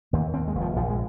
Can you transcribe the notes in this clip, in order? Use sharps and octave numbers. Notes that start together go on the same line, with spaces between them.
D#2 A#3
D#2 C4
G#3
F1
F3
A#1 F3
G#3